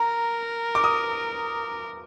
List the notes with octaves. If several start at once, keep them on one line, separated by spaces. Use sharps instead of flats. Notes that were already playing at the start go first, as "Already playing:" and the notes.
Already playing: A#4 A#5
D6
D#6